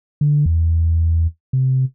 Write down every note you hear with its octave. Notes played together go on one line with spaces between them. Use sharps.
D3
E2
C3